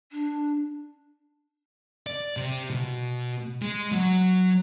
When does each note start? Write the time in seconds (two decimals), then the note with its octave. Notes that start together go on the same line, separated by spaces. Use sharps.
0.12 D4
2.07 D5
2.37 C3
2.70 B2
3.62 G#3
3.92 F#3